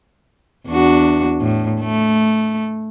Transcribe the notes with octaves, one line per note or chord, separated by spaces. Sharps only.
E2 D4 F#4
A2
A3